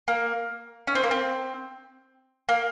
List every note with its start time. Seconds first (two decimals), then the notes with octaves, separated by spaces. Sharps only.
0.08 A#3
0.87 C#4
0.95 C4
1.04 A#3
1.11 C4
2.49 A#3